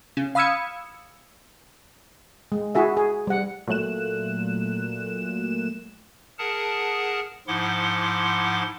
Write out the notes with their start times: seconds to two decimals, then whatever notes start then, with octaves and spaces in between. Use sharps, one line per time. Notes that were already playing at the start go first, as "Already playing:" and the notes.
0.17 C#3
0.35 F5 B5 D#6 E6 G#6 C#7
2.52 G#3
2.75 E4 F#4 G#4 E5
2.97 G#4
3.27 G3 F#5
3.68 A#2 F#3 A3 F#6 E7
6.39 G#4 A#4 F#5 A5
7.48 G#2 F3 E4 F#5 C6 D6